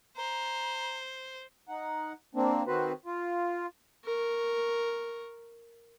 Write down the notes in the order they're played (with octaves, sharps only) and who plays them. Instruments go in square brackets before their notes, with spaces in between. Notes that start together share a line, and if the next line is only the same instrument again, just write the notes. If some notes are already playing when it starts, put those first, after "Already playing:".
[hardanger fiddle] C5 [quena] A#5
[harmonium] D#4 F#5
A#3 C4 D4
D#3 C4 F#4 B4 C5
F4
[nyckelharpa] A#4 C#6